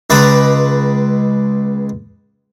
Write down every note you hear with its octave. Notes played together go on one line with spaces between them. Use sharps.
C#2 G#3 B4 D5 A#5 B5